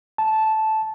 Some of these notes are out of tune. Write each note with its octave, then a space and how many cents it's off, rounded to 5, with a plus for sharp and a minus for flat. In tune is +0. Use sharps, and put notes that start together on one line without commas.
A5 -10